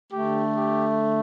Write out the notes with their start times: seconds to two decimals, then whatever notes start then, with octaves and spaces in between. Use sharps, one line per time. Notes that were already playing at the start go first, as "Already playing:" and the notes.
0.11 D3 A3 G4
0.56 G4